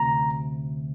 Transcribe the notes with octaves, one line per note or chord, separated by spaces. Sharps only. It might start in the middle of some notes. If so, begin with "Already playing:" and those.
Already playing: D2 C3 A#5